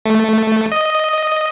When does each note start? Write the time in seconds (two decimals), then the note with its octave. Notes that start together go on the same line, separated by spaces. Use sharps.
0.06 A3
0.72 D#5